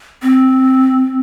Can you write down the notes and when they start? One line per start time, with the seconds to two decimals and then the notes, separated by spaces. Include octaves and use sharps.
0.22 C4